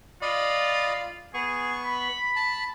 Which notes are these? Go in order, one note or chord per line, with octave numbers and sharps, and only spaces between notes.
F4 D5 D#5 B5
B3 G#4 C#6
B5
A5